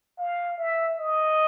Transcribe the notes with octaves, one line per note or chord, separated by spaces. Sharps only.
F5
E5
D#5